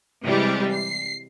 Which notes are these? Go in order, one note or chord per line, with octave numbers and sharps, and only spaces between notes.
C3 E3 G3 G#3 G4
C7